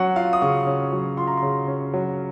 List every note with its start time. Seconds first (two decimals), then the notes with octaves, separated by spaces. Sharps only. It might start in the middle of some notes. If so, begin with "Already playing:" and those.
Already playing: F#3 C#4 F#5 C#6
0.16 F4 F5
0.33 D#6
0.42 C#3 C#6
0.67 C#4
0.93 F#3
1.17 F4 C6
1.27 A#5
1.37 C#3 C6
1.68 C#4
1.94 F#3